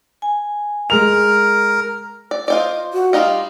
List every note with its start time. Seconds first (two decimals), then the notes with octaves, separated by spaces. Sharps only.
0.22 G#5
0.90 G#3 A#4 F7
2.31 D5
2.48 F4 C5 D5 D#5
2.94 F#4
3.13 G3 D#4 F4 F5